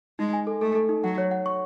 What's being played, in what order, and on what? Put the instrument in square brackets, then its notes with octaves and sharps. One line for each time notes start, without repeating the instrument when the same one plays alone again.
[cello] G#3 [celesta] D#4
[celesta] G#5
A4
[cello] A3 [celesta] A4
[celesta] A4
D#4
[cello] F#3 [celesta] F#5
[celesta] C#5
F#5
C#6